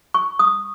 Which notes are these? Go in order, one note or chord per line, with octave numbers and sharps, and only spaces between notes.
C#6
D#6